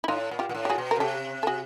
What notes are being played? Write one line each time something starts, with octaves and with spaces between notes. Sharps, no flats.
E4
A2 D#4 F4
A#2
F4 G4
A#2
A2
G4
F#4 G#4
B2
A#4
C#3
C3 G4 A4
A4
F#4 G#4